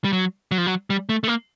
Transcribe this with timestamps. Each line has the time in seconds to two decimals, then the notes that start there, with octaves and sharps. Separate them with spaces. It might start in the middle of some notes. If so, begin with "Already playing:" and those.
0.04 G3
0.13 F#3
0.51 F#3
0.58 F3
0.67 F#3
0.90 G3
1.09 A3
1.24 A3
1.28 A#3